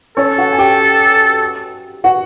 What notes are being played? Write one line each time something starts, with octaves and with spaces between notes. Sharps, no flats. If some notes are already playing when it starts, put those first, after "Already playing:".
C#4 A4 C#5
F#4 F#5
G#5
G4 G5
F#4 F#5